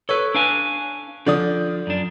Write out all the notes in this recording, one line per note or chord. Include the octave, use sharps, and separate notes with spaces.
A4 B4 C#5
D4 F5 G#5
D3 F3 D5 D#6
F#2 D4